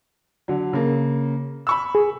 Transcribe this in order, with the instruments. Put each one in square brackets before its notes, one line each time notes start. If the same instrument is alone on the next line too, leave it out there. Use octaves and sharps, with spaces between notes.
[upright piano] D3 F#3
C#3 A#3
B5 C#6 E6
[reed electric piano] G#4